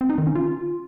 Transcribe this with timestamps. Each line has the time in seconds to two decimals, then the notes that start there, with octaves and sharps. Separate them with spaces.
0.01 C4
0.09 D#4
0.18 D#3
0.27 C#4
0.35 F4